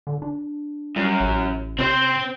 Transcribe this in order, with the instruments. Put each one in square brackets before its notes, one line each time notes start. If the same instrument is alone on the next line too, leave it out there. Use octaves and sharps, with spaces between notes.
[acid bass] D3
D4
[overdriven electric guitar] F#2 [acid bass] G3
[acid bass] A1
[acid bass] C3 [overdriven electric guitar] C4 C5